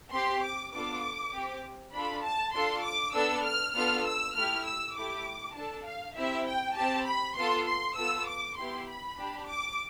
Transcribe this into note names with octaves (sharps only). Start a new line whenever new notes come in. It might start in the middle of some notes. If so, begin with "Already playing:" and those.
C4 G4 C6
D6
B3 D4 F4 A4 D6
C4 G4
D4 F4 A4 B5
A5
D4 F4 A4 C6
D6
B3 D4 A4 E6
F6
B3 D4 F4 A4 F6
E6
A3 E4 G4 F6
E6
A3 E4 G4 D6
D4 A4 A5
F5
C4 E4 G4 E5
G5
C4 G4 A5
B5
B3 F4 A4 C6
C6
B3 F4 A4 E6
D6
B3 E4 G4 C6
B5
D4 G4
D6